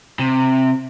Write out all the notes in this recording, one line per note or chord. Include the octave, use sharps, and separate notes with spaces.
C3